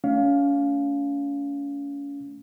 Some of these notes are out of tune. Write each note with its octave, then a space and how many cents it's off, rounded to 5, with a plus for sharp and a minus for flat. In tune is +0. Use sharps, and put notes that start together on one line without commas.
A3 +0 C#4 +35 F5 +0